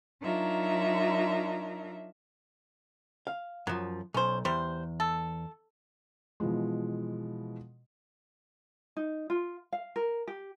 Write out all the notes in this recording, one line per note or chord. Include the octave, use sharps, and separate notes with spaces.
F#3 D4 D#4 F4 A#4 E5
F5
F#2 F3 F#3
B1 C#4 C5
E2 G3 C5
A4
B2 E3 F3 G#3
D#4
F4
F5
A#4
G4